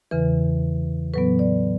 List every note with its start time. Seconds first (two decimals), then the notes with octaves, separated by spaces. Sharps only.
0.11 E2 C#3 E3 B4
1.14 A2 F#3 B3 B4
1.39 D5